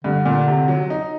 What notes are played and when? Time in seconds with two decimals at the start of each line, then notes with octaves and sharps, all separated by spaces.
0.04 G2 D3
0.25 A#2
0.48 C3
0.68 F#3
0.90 D#4